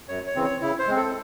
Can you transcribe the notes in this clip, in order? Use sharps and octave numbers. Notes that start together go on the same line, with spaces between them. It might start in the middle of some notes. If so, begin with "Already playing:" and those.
F#2 C#5
C#5
C#3 E3 C4
C#5
C#3 E4
C5
G#3 C4
A4